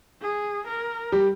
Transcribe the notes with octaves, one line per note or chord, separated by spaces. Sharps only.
G#4
A#4
G3 G4